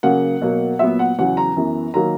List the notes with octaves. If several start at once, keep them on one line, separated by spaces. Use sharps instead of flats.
C#3 F#3 A#3 F#5
B2 F#3 A#3
A#2 F#3 B3 E5
F#5
E2 C#3 F#3 F#5
A#5
F#2 E3 B3
D#3 F#3 A#3 A#5